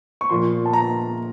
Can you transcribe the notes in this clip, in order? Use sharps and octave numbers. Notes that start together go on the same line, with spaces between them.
C#6
A#2 F3 C6
A5
A#5